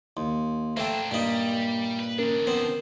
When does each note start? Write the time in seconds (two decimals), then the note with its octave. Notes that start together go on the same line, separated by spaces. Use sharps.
0.17 D#2 C6
0.77 A3 A#3 D4 A4 C5 G5
1.11 G2 A#2 G3 A#3 D#4
2.00 B4
2.19 D#3 C#4 D4 A#4
2.47 B3 C4 C5